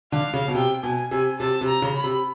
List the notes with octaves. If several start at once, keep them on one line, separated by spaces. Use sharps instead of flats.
D3 F5
C#3
B2
C3 G5
B2 G#5
C3 G#5
C3 A5
C3
A#5
C#3
B5
C3